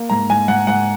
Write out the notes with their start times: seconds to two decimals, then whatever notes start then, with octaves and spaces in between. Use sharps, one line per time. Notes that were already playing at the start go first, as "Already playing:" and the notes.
Already playing: A#3
0.10 G#2 A#5
0.30 G#2 G#5
0.48 G#2 F#5
0.67 G#2 F#5